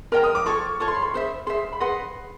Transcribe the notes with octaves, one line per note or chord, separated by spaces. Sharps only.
A#4 D#5 G5 A#5 F6
D#6
D6
F4 A4 C#5 C#6
F4 A4 C#5 C#6
C6
B5
C6
G#4 C5 E5
G#4 C5 E5 C6
B5
G#4 B4 D#5 F#5 C6